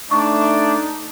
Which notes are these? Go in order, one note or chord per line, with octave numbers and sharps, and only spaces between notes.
A3 D4 D#4 C#6